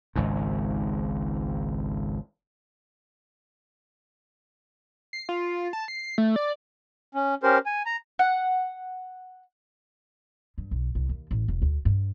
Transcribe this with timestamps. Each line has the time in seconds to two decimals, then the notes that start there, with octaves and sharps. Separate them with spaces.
0.15 G#1 C#2 G#2
5.13 C7
5.29 F4
5.73 A5
5.88 C7
6.18 A3
6.36 D5
7.14 C#4
7.43 C#4 G4 A#4 C5
7.66 G#5
7.86 A#5
8.19 F#5
10.58 G2
10.71 B1
10.95 C2
11.09 D#2
11.31 A1
11.48 E1
11.62 D2
11.85 G2